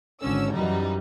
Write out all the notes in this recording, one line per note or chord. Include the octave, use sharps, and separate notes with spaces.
G#1 D3 C#4 E6
F#2 E3 F#3 G3 D#4